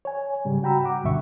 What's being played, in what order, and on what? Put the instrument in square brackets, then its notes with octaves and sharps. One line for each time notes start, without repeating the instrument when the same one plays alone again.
[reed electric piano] C#5 G#5
G#2 C#3 G3
F#4 G5 A#5 B5 E6
F#5 D6
C#2 G2 B2 D3 E5 C#6